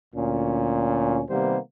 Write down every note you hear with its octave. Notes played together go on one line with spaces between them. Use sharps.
D2 A#2 C#4
C3 D#3 G3 A#3 B3 C5